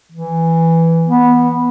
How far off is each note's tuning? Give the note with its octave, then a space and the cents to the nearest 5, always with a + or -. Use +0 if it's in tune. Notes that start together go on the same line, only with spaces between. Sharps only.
E3 +0
B3 -10